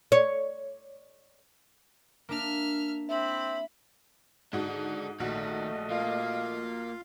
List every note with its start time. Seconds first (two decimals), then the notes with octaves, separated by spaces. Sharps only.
0.12 C#5
2.29 A#3 D4 E5 F6
3.09 C4 E4 E5 B5
4.53 G#2 D4 F#4 A4
5.20 A#1 D#3 A3 F#4 D#5
5.90 A#3 F4 F5